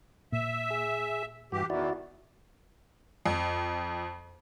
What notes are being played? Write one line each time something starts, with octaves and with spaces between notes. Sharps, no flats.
A#2 E5
G#4
G2 E3 F#4 G4
E2 D#3 E3 E4 F#4 D5
F2